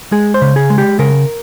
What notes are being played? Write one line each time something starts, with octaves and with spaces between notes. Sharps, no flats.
G#3 G#4
C5
C#3
G#4
G#3
G4
C#3 A#4